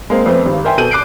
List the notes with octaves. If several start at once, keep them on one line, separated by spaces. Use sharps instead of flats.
G#3 A#3 C4
F2 A3 B3 C4
G#1 G2
A#4 C5 E5 G5 G#5
B2 A4 G6 D#7 F#7
D6 F#6 C7 D7